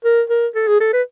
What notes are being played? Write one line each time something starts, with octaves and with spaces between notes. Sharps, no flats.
A#4
A#4
A4
G#4
A4
B4